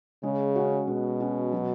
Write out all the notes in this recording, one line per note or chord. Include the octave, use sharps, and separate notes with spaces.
C#3 G#3
C#4 F#4
B2 G#3
C#4 F#4
F#3